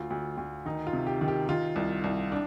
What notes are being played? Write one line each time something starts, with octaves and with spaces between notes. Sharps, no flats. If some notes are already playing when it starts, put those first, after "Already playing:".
Already playing: D2 F4
D2
D2
D#3 D#4
F4
C3
G4
D#3
G4
D#3 F4
C2
C2
D4